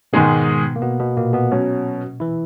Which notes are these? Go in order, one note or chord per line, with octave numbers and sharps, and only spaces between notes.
G#2 B2 D#3 G#3 B3 D#4 G#4
A#3
B2 B3
B2 B3
A#2 A#3
B2 B3
B2 F#3 C#4
E3 E4